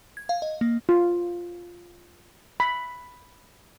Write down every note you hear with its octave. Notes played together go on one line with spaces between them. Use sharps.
G#6
F5
D#5
A#3
F4
B5